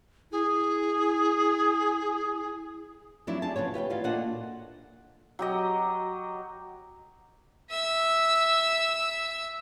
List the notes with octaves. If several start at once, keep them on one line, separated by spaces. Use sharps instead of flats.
E4 G#4
F2 F#3 D4 E4 D5
G4 G#4 A5
C#3 F3 B3 C#5
G4 B4 F5 G5
E3 F4 F#4 D5
A#2 D4 A4 D#5 F#5
F#3 G4 D#5
E5 E6